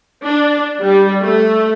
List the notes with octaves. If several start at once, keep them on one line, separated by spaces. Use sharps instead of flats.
D4
G3
A3